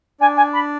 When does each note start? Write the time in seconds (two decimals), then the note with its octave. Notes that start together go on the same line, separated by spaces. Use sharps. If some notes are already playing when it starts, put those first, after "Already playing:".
0.20 D4 D5 G#5
0.36 G#5
0.53 B5